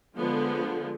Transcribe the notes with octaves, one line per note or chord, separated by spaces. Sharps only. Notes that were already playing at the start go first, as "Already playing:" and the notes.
D3 F3 G#3 B3